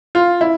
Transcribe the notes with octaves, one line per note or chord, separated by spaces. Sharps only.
F4
E4